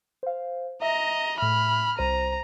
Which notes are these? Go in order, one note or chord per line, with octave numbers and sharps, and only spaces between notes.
C5 F5
D#5 E5 A#5
A2 E5 B5 F6
C2 C5 A#5 D#7